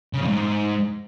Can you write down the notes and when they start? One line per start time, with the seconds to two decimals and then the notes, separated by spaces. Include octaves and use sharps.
0.13 C#3
0.21 F2
0.28 G#2